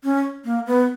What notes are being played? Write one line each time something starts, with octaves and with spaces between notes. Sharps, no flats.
C#4
A#3
B3